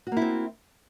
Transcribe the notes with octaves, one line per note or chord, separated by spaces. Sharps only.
A#3 C4 E4 F#4